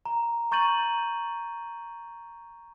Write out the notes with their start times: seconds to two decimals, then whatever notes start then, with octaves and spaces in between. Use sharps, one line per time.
0.06 A#5
0.51 A#5 C#6 G6 A6 D#7 F#7